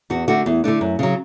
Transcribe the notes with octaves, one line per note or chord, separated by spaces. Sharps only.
E2 F#4
D3 A3 D4 F#4
E2
D3 A3 D4
F#2
C#3 F#3